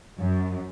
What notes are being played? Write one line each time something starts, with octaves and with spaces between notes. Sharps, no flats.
F#2